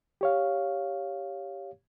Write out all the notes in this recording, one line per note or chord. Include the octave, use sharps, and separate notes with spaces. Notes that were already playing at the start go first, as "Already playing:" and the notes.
G4 C#5 F5